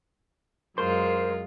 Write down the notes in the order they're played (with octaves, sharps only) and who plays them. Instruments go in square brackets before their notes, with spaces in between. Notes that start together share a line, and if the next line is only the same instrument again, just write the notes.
[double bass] F#2 [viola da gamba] G#3 F4 [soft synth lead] A#4 [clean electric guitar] C5